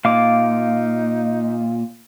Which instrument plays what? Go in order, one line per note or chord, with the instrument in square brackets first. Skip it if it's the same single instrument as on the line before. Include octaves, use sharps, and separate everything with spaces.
[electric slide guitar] A#2 [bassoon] D#4 [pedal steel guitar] F5 D6